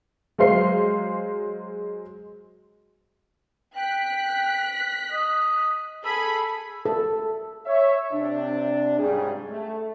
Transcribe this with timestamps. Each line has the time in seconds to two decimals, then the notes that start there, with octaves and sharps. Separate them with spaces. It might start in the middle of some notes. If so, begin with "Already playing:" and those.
0.38 F#3 G#3 C5 F5 C6 C7
3.76 G5 F#6 B6
5.12 D#5
6.05 G#4 A4 B5
6.85 A4
7.66 C#5 E5
8.12 C3 D4
8.99 C#2 G#2 C#3 G3 G#4
9.49 A3